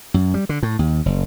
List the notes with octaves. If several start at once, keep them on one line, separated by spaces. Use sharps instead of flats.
F#2
G3
D3
A2
D#2
F#1